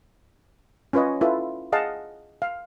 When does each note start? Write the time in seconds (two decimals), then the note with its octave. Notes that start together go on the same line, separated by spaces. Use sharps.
0.93 C#4 F4 B4 C#5 D#5
1.21 E4 F4 A4 B4
1.72 G#4 D#5 F5 F#5 A5
2.42 F5